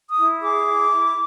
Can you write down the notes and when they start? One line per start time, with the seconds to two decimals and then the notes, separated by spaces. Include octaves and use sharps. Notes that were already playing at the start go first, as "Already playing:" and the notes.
0.09 D#6
0.18 E4
0.42 G#4 D6
0.67 E4
0.91 E4